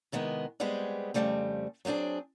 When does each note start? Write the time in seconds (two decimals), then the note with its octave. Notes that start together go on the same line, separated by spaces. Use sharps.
0.12 C3 D#3 G#3 B3
0.60 G3 G#3 B3 C4 G4 G#4
1.14 F2 A#2 C#3 G3 A3 C4
1.85 F#3 B3 C4 D4 G#4